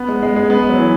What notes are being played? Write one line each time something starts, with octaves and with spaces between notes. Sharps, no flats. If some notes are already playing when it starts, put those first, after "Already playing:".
Already playing: B3
G#3
G#3
G#3
B3
F#3
E3